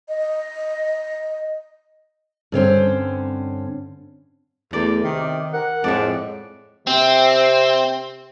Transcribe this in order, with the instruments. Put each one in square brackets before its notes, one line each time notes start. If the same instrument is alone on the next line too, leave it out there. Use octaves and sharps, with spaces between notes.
[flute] D#5
[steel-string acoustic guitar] G2 D3 C4 C#4
[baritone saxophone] E2 [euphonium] A3 [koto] D5
[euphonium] C3 [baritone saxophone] D#3
[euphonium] A#4 [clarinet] F#5
[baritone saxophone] F2 [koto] A2 D5 [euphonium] G#3
[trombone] C3 [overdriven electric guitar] C4